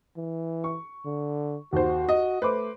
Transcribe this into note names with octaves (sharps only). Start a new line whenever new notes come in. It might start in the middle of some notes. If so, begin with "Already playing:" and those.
E3
C#6
D3
D#2 F#4 C5
D#5
A3 B4 C5 D6